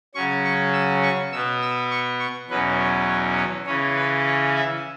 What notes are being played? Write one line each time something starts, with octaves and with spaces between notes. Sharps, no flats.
C#3 F#3 C#4 C#6
C#6
E6
C#6
B2 B3 E6
E6
C#6
C#6
E2 B2 F#3 C#4 B4
C#5
C#5
C#5
C#3 E3 C#4 C#5
B4
C#5
E5